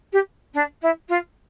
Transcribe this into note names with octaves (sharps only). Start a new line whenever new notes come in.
G4
D4
E4
F4